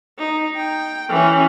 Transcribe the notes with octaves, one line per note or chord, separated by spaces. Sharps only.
D#4
G5
E3 C#4